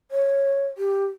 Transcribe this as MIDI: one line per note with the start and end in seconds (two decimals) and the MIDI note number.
0.11 0.67 73
0.78 1.05 67